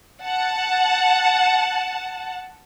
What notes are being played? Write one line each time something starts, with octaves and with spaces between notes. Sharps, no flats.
F#5 A5